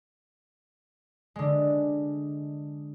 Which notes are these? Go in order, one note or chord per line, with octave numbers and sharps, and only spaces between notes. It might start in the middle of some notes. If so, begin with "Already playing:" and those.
D3 G#3